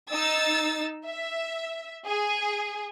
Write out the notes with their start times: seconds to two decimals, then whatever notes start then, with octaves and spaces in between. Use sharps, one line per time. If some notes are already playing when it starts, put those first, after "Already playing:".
0.12 D#4 E6 A6
1.07 E5
2.06 G#4